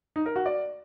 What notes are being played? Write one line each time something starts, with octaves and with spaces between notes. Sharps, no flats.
D#4
A#4
F#4
D5